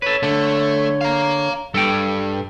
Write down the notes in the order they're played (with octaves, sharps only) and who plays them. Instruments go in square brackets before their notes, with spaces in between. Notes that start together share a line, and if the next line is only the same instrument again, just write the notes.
[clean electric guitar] A4 B4 [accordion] C#5
[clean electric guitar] D3 [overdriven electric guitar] A3
[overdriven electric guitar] F5 A#5
[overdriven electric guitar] G2 [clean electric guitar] A4 G5